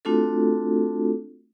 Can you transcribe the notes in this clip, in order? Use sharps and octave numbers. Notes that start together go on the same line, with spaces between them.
A3 C4 D4 F4 F#4 A4